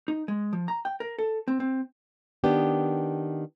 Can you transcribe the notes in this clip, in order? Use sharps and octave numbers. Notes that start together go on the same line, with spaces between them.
D#4
G#3
F3
A#5
G5
A#4
A4
C4
C4
D#3 B3 D4 G4